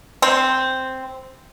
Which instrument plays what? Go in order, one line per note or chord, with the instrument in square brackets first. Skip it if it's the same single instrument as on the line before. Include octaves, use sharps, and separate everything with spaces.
[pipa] C4